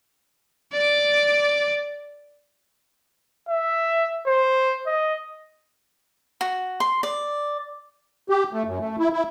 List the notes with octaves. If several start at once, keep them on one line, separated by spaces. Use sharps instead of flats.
D5 D6
E5
C5
D#5
F#4
C6
D5
G4
A3
F#2
A3
E4
E4